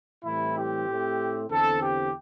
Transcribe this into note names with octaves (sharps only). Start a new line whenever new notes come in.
A2 E3 G3 C4 E4
G4
A2 A3 C4
E2 D3 C4 A4
G4